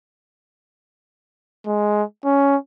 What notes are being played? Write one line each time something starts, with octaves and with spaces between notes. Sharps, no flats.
G#3
C#4